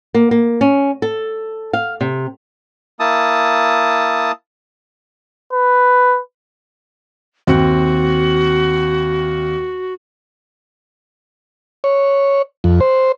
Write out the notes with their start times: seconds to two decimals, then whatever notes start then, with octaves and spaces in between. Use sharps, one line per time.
0.14 A#3
0.31 A#3
0.61 C#4
1.02 A4
1.73 F5
2.01 C3
3.00 A#3 E4 A5 D#6
5.53 B4
7.47 D#2 C4 F#4
11.84 C#5
12.64 F2
12.80 C5